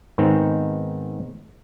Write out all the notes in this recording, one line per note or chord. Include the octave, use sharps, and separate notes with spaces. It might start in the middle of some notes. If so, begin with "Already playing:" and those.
G#2 D#3 B3 C4 D#4